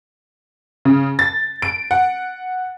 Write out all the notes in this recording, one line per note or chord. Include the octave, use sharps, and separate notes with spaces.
C#3
A6
D7
F#5